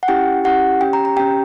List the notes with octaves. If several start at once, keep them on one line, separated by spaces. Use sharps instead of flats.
F#5
C#4 E4 G4 G5
C#4 E4 G4 F#5
C#4 G4 G5
A#5
A#5
C#4 G4 G5